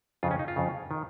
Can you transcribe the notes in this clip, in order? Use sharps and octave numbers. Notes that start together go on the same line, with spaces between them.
F2 C#3 F4
C#4
D#4
F4
F2 C#3
D#3